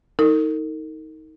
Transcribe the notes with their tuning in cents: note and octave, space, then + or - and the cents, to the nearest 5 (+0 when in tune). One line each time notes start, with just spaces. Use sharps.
D#4 +25 A#4 -45